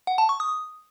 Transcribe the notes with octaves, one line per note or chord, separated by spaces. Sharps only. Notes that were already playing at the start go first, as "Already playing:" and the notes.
F#5
A5
C#6
D#6